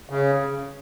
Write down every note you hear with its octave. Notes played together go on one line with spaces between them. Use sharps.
C#3